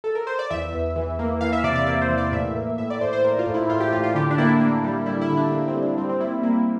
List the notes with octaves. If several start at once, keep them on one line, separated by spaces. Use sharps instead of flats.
A4
A#4
C5
D5
E2 E5
E2
E3
A#3
E3 F5
E5
C3 D5
D5
A#3 D5
C5
E3
D5
A2 E5
A#3
A2 E5
D5
A2 C5
C5
A2 A#4
F4
A2
E4
A2 F4
G4
A2 F4
F4
D3 G4
D4
A#3 E4
D4
A#3 D4
G3
G3 E4
E4
D3
D4
A#3 D4
C4
G3
D4
G3 C4
C4
G3 E4
A#3 E4